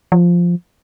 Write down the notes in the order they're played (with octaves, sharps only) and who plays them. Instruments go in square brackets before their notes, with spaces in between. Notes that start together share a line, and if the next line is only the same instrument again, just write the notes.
[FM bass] F3